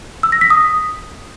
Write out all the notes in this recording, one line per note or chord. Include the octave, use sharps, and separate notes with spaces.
E6
A#6
B6
D#6